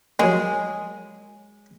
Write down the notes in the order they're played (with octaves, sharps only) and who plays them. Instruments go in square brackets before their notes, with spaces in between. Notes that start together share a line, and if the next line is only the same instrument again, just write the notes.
[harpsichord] F#3 A#3 [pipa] G#3